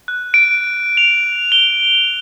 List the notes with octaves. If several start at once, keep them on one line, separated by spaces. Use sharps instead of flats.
F#6
D7
F7
G7